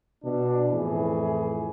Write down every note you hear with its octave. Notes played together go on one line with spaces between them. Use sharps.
B2 D4
F2 A2 E3 G#4